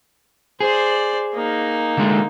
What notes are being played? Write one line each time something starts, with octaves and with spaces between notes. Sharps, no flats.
G#4 C5 D5
A#3 D#4
D3 G#3 A3